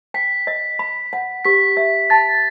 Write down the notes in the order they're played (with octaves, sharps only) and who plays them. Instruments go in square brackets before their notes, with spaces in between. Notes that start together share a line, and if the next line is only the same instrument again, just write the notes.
[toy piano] G5 [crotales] B6
[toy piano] D#5
B5
F#5
[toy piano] G4 [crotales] B6
[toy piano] E5
[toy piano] A5 [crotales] A6